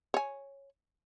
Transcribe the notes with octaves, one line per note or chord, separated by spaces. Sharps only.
C#5 G#5